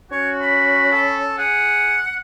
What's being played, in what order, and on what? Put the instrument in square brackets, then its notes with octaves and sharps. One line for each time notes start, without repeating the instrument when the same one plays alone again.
[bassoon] C#4 [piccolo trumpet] F#4 [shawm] C#5
[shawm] B5
[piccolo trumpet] A4
[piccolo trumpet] G#4 [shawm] F#5